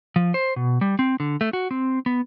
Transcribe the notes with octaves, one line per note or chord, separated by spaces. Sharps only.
F3
C5
B2
G3
C4
D3
A3
F#4
C4
B3